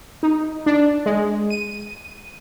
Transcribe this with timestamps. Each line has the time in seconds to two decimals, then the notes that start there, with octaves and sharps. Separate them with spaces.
0.23 D#4
0.66 D4
1.06 G#3
1.50 D#7